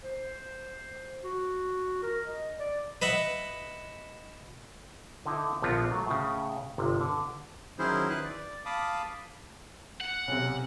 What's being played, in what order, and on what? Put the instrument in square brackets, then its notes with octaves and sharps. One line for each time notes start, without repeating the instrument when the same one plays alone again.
[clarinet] C5
F#4
A#4
D#5
D5
[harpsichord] B4 D#5 E5 F#5
[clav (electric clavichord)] D3 D#4 E4
A#1 D3 F3 B3 C4 F4
F#3 A3
A2 C#3
G1 C3
D3
[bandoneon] D#3 F#3 C#4 E4 G#4 C5
E4 B4 F#6
D5
F5 A5 B5 D6 D#6
[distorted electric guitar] F#5
[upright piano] B1 C3